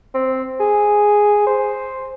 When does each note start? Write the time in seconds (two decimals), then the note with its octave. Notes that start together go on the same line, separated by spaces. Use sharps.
0.14 C4
0.60 G#4
1.47 C5